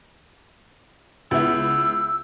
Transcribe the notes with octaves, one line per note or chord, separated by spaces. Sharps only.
C#2 B3 E4 E6